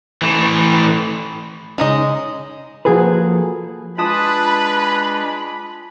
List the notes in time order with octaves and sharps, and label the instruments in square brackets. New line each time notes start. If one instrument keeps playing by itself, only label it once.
[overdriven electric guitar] E3 A3
[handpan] C#3 C#4 [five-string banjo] G#3 D#4 D#5
[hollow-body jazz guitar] F3 A#3 F#4 G#4 A4 B4
[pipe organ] G#3 D4 [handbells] F4 A5 D#6 [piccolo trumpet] B4 [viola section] B5